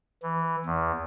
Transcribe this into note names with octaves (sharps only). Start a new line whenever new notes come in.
E3
E2